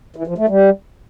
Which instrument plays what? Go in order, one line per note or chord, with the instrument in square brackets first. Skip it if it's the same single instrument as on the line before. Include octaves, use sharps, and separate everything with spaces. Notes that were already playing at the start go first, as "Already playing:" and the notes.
[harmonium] E3
F3
A3
G3